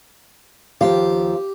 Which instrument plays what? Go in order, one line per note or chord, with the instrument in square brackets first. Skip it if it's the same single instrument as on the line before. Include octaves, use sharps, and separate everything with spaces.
[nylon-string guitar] D#2 F3 F5 [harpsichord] G4